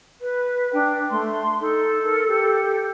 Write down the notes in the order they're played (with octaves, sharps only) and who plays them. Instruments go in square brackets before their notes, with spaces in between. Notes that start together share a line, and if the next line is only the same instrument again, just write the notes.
[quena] B4
[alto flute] D4 [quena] G5
[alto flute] A3 [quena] C6
[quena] D#4 [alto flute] A4
[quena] A#4
G4